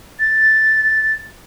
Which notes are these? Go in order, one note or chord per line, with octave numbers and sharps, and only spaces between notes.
A6